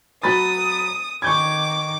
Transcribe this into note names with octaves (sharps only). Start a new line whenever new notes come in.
F#3 B5 D#6 A6
D#3 C#6 D6 G6 G#6